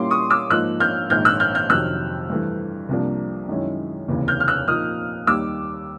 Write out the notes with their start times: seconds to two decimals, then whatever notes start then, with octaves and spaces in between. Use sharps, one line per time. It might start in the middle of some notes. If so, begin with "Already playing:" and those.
Already playing: A#2 G3 A#3 C#4 E4 C6 D6
0.10 C#6 D#6
0.30 D6 E6
0.50 G#2 F3 A#3 D#4 E6 F#6
0.80 F6 G6
1.10 A#1 G#2 D#3 F6 G6
1.25 E6 F#6
1.40 F6 G6
1.55 F6 G6
1.70 F2 C3 D#3 F#3 E6 F#6
2.30 G2 E3 A3
2.89 C2 C3 F3 A#3 D4
3.49 F#2 D#3 G#3 C#4 E4
4.08 F1 D#2 C#3 E3
4.28 F6 G6
4.40 F6
4.48 E6 F#6
4.68 A#2 F3 A#3 D#4 D#6 F6
5.27 D#2 D#3 G3 D6 E6